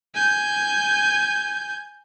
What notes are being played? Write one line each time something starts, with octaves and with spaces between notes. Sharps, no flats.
G#5 G6